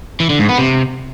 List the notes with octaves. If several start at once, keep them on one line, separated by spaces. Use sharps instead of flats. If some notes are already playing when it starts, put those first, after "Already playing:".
E3
D3
G#2
B3
C3